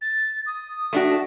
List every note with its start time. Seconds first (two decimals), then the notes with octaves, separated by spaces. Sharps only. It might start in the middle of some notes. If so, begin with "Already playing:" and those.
0.01 A6
0.46 D#6
0.93 A3 D4 F#4
1.09 A5